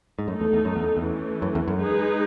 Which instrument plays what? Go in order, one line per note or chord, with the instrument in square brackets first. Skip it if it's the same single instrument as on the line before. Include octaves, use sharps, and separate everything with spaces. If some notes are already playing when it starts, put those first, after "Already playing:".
[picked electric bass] G#2
[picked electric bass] F#2 [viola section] A3 D#4 A4
[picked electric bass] E2
E2
F#2
E2
E2
[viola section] E3 A3 C#4
[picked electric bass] F#2
E2
F#2
[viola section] G#3 D#4 G#4 B4